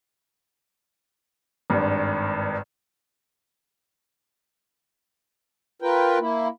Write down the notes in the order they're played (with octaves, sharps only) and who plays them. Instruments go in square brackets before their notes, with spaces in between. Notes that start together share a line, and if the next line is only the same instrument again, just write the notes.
[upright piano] G#1 G2
[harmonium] F4 A#4 B4 G5
A#3 E4